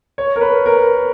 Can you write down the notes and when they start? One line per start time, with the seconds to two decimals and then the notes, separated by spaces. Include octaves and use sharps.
0.18 C#5
0.36 A#4
0.41 B4
0.66 A#4